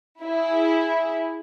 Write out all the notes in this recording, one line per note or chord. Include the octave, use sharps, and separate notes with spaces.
E4 G#4